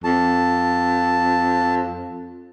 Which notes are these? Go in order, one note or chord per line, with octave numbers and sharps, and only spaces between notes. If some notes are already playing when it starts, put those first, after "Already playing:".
F2 A5